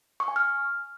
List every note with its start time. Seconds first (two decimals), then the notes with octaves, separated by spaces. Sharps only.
0.20 C#6
0.28 G#5
0.36 F6